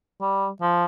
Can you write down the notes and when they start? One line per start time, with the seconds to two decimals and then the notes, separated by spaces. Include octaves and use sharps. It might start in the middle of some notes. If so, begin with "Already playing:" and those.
0.21 G3
0.62 F3